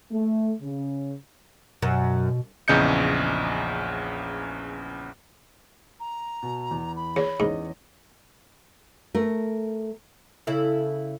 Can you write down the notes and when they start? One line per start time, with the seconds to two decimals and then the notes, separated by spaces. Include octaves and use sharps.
0.11 A3
0.61 C#3
1.82 F#2 B2
2.68 A#1 E2 C#3 D#5 G6 C#7
6.00 A#5
6.43 B2
6.71 E2
6.96 B5
7.16 E2 C#5
7.40 E2 G#2 C#4 D#5
9.15 A3 A#4
10.47 C#3 E4 A4